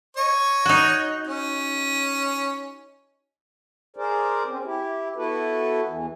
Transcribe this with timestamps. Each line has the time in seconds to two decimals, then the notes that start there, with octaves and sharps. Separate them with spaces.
0.17 C#5 D#5 C#6
0.66 D#4 F#4
1.27 C#4
3.97 G#4 A#4 C5 D5
4.46 C4 C#4
4.64 E4 G4
5.16 B3 E4 F#4 A4 B4
5.88 E2 E3